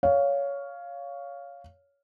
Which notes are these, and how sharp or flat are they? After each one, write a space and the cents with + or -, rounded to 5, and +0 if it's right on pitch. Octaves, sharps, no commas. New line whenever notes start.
C#5 +15 F5 +0